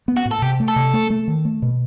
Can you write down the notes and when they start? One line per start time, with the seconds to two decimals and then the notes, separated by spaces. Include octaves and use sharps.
0.08 B3
0.17 F#4
0.25 A2
0.31 A4
0.42 C3 G4
0.60 A3
0.68 A4
0.76 C3
0.94 A3
1.10 A3
1.28 D#3
1.45 A3
1.62 B2